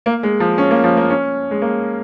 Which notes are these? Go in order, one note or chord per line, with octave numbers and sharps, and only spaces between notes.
A#3
G#3
F3
C#4
A#3
F3
A#3
C#4
G#3
A#3